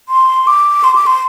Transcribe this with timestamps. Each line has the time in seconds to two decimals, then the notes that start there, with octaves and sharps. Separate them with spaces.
0.09 C6
0.47 D6
0.84 C6
0.95 D6
1.06 C6